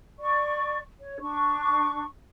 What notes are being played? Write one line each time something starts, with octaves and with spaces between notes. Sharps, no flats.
D5 C#6
C#5
D4 C#6